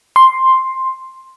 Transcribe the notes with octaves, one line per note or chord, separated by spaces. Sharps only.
C6